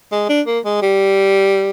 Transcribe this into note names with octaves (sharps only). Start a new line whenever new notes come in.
G#3
D4
A#3
G#3
G3